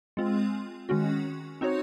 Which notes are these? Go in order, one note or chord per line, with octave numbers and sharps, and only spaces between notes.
G#3 C4 F4
D#3 G#3 C#4 F#4
C4 D#4 F#4 C#5